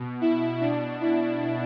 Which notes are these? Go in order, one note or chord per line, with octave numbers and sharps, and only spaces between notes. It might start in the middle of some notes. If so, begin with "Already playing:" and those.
Already playing: B2
E4
B2 D4
E4